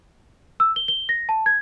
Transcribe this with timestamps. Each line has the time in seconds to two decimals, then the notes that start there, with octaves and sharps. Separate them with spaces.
0.60 E6
0.76 G7
0.88 G7
1.09 A#6
1.29 A5
1.46 G#6